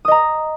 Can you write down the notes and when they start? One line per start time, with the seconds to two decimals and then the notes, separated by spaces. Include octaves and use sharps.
0.05 D#6
0.08 D#5
0.11 A#5